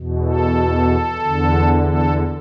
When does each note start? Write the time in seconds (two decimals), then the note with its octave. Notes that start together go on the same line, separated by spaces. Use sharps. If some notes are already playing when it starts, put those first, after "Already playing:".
Already playing: E2 B2
0.25 A4
1.21 E2 D3
1.86 A4